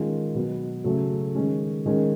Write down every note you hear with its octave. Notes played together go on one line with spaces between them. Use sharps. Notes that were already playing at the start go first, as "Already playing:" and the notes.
Already playing: D#3 G#3 C#4 F4
B2 F#3 B3
C#3 F#3 A3
D#3 G#3 C#4
D#3 G#3 C#4